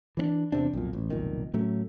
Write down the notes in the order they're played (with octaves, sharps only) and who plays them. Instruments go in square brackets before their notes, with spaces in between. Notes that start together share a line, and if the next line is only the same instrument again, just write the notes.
[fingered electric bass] E3 C4 D4
E2 C3 C4 D4
B1 F2 A#2
A1
F1 B1 A#2 D#3
A2 F#3 A3 C#4